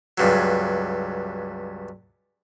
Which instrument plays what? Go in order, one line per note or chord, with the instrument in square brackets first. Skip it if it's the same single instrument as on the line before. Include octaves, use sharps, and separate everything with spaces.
[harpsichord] C#2 G2 F#3